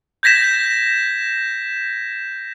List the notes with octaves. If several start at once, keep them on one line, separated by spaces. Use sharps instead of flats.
G6 G#6 A#6 B6 E7